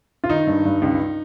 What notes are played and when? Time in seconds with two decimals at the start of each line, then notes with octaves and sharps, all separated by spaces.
0.24 F4
0.29 D#3 D#4
0.47 G2
0.65 G2
0.82 C#2